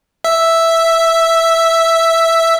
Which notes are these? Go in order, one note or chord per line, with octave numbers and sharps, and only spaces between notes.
E5 E6